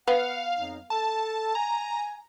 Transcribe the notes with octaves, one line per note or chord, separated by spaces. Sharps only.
B3 F5 F#5
F2 F#3 D#4
A4 A5
G#5 A#5